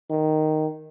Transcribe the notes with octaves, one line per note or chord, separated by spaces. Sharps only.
D#3